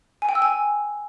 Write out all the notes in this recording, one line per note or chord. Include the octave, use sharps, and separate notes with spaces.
G#5
G5
E6
G#5